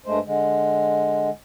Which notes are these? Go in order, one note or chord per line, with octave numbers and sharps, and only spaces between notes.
G2 G#3 A3 C5
D3 G#3